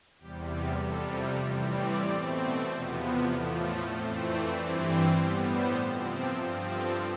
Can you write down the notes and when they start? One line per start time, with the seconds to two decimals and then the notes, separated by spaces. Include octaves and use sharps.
0.19 E2 C3 G3 G4
0.51 G4
0.82 F2 C3 G3 A4
1.44 A2 E3 G3 C4
1.76 D5
2.07 B2 A3 C4
2.68 E2 C3 F3 B3 C5
3.00 B4
3.30 A2 F3 A3 D5
3.62 C5
3.93 F2 E3 A3 C4 C5
4.24 D5
4.56 G2 E3 G3 C4 D5
4.87 C5
5.18 A2 G3 B3
5.49 C5
5.80 C3 F3 C4
6.11 A4
6.43 G2 F3 C4 G4
6.74 A4